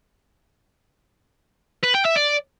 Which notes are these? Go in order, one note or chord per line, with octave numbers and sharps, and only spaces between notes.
B4
G5
E5
D5